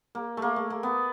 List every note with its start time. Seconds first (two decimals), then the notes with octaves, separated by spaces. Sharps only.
0.15 A#3
0.37 A3 A#3
0.56 A3
0.70 A#3
0.83 B3